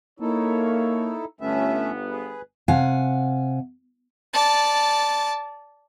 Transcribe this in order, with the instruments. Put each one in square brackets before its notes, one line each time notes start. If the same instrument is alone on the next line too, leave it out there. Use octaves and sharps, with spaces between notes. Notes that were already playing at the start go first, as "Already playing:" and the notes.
[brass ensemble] A#3 C#5 [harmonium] D#4 E4 A4
[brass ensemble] G1 B3 [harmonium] A3 C#4 E5
[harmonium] G#4 B4
[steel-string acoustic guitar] C3 F5 F#5 G#5
[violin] D5 A5